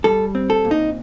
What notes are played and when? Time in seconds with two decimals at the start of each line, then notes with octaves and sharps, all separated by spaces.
0.04 G3 A4
0.35 C4
0.50 A4
0.65 A#2
0.71 D#4